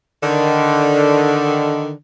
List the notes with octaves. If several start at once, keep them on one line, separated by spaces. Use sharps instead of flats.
D3 D#3